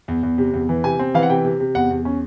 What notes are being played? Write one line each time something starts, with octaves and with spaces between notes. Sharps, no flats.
E2
E2
C3
E2
E3
C3 G#5
C4
E3 F5
F#5
C3 G5
C3
C3
E2 F#5
E2
C#4